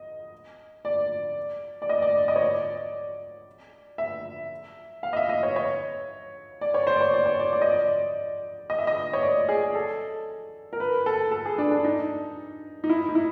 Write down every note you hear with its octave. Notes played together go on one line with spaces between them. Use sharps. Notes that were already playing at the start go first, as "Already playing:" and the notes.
Already playing: D#5
D5
D5
D#5
D5
D#5
C#5
D5
E5
F5
D#5
E5
D#5
C#5
C#5
D5
C#5
C5
D5
C#5
D5
C#5
D5
D5
D#5
D5
D#5
E5
D#5
C#5
D5
G#4
A4
A#4
B4
A4
A4
G#4
D4
D4
D#4
D#4
E4
D#4
E4